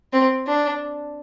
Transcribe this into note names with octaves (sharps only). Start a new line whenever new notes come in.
C4
D4